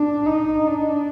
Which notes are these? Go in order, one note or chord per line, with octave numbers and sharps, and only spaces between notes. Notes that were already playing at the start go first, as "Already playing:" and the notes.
Already playing: D4
D#4
D4